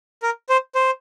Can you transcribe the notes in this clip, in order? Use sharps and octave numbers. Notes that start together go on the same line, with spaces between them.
A#4
C5
C5